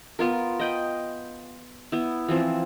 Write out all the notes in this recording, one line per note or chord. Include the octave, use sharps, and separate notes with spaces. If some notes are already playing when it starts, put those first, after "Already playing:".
B3 F4 A#4
D#5 G5 B5
B3 E4
E3 F3 C4 F4